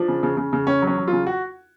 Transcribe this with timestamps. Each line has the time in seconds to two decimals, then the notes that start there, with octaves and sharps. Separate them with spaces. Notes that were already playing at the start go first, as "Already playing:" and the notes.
Already playing: F3 D4
0.08 C#3
0.23 C#3
0.37 C#3
0.53 C#3
0.67 C#3 C#4
0.82 F#3
0.87 C#4
0.97 F#3
1.08 C#3 F4
1.27 F#4